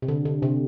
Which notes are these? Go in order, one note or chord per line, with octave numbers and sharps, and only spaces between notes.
C3
D3
D3
C3